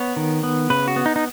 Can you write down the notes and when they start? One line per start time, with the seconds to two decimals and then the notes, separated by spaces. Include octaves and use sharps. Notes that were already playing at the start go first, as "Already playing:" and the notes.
Already playing: B3 C#5
0.16 D#3
0.43 B3
0.70 C#3 B4
0.88 F#4
0.96 B3
1.06 D#4
1.16 D#4